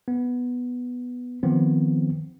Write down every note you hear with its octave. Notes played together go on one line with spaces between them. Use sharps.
B3
D#3 F3 B3 C4